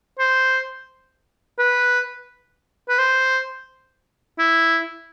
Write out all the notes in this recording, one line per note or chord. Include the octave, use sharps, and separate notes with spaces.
C5
B4
B4
C5
E4